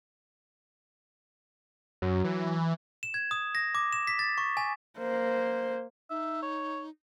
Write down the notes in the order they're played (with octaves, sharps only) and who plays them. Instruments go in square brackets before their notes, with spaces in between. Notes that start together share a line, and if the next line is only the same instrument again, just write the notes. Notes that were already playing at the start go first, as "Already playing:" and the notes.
[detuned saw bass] F#2 [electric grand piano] F#3
[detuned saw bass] E3
[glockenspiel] E7
G#6
D#6
A#6
D6
E7
B6
A6
C#6
G#5
[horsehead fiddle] A#3 C5
[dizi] D#4 [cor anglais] E5
[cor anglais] C#5